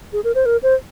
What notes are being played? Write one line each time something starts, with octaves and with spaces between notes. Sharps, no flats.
G#4
A#4
C5
A#4
C5